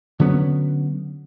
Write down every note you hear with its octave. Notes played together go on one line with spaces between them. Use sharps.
D3 F#3 B3 C#4